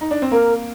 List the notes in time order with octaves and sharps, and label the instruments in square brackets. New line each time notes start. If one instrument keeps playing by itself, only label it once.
[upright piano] D#4
D4
C4
[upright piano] A#3 [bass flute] A#4